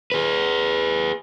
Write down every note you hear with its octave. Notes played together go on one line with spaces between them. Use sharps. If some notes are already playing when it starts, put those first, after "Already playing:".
G#4 B4